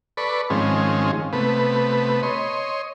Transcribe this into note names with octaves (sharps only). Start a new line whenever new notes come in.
A4 B4 D5 B5 C#6
G#2 D#3 F3 G#3 C4 C#4
C3 A3 B3 B4
C#5 D#5 C6